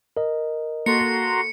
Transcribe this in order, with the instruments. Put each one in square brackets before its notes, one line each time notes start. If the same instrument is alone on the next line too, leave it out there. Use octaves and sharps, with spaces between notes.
[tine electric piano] A#4 D#5
[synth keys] A#3 A4 [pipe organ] F#4 A#5 C6 [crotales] C#7